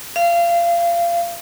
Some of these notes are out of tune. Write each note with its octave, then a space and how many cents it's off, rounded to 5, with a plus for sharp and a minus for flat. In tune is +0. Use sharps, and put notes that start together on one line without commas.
F5 -25